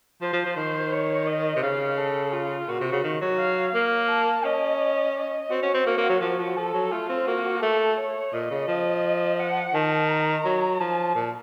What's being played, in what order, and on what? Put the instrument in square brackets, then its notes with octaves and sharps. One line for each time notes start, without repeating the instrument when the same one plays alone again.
[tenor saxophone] F3 [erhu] C5
[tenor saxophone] F3
F3
[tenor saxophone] D#3 [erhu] C5
[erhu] C#5
D#5
[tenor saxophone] C3
[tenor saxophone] C#3 [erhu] F5
[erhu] A4
F4
[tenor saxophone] A#2 [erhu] F#4
[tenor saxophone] C3
C#3
D#3
F#3
[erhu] F5
[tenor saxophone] A#3
[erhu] A5
[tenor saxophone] C#4 [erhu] D#5
[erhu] D#5
[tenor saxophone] C4 [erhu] F#4
[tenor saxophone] C#4
C4
[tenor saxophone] A#3 [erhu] F#4
[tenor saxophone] A#3
F#3
[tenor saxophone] F3 [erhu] F#4
[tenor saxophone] F3
[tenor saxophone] F3 [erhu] A4
[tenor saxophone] F#3
[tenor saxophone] A3 [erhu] F4
[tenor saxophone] C4
[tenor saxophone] A#3 [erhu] F#4
[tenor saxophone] A3 [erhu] A4
[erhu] C#5
[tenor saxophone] A#2 [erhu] D#5
[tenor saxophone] C#3
F3
[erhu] F#5
[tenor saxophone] D#3 [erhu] A5
[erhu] A#5
[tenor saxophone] F#3
[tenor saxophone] F3 [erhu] A5
[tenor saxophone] A#2